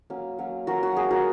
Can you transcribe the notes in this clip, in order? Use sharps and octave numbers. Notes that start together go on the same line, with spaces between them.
F#3 A#3 C#4
F#3 A#3 C#4
F#3 A#3 C#4 F#4 A#4
F#4
G#3 C#4 G#4
F#4 A#4